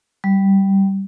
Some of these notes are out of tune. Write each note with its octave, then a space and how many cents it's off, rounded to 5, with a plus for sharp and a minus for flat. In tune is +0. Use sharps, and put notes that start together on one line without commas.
G3 -10